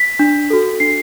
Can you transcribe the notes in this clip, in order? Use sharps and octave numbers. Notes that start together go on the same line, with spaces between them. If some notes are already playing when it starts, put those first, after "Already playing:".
Already playing: B6
D4
F#4 A4
D4 C7